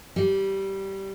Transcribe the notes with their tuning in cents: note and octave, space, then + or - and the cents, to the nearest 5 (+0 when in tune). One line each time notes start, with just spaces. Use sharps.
G3 -15